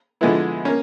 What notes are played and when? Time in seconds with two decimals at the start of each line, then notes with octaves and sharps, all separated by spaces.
0.21 D3 F3 G#3 B3 E4
0.65 A#3 C#4